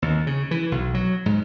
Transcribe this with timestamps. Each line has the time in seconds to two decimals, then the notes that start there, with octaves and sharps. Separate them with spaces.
0.02 D#2
0.27 C#3
0.51 E3
0.72 B1
0.94 F#3
1.26 G#2